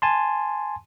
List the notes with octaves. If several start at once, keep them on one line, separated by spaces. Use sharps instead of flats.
G#5 A5 C6